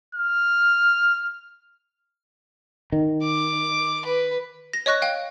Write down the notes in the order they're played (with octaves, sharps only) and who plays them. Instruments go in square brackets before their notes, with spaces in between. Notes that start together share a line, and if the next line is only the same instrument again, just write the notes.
[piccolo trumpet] F6
[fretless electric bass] D#3
[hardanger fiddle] D6
B4
[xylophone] A#6
C#5 D#5 C#6 F#6 A#6
F5 G5